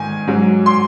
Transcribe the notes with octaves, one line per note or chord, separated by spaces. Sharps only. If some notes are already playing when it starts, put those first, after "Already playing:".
Already playing: G#2 D#3 G#5
G#2 F#3
C6